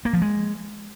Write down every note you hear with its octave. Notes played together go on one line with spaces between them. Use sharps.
A#3
F3
G#3